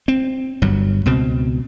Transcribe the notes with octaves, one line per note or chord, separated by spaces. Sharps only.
C4
G1 G2 F#3
C#2 B2 C4